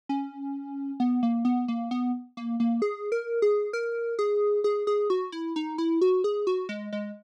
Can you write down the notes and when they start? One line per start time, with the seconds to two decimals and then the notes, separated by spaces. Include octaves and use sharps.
0.09 C#4
1.00 B3
1.23 A#3
1.45 B3
1.68 A#3
1.91 B3
2.37 A#3
2.60 A#3
2.82 G#4
3.12 A#4
3.42 G#4
3.73 A#4
4.19 G#4
4.64 G#4
4.87 G#4
5.10 F#4
5.32 E4
5.56 D#4
5.78 E4
6.01 F#4
6.24 G#4
6.47 F#4
6.69 G#3
6.93 G#3